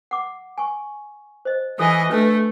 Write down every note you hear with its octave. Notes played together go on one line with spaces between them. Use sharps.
F#5 D6
G#5 C#6
C5 D#5
E3 A4 D#5 G#5
A3 D4 B4